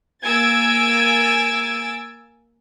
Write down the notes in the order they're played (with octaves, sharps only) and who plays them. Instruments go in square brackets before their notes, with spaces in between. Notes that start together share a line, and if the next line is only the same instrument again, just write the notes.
[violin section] A#3 G#5 E6 G#6 A6 D7